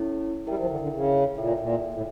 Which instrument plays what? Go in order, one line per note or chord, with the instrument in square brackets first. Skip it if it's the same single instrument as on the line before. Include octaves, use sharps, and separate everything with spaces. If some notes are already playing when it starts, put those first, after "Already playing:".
Already playing: [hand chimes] C#4 E4 A4 C#5
[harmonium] G3 [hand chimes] E4 A#4 E5 G5
[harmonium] F3
D3
D3
C#3
[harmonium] A#2 [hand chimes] E4 A4 E5 G5
[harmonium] A#2
A2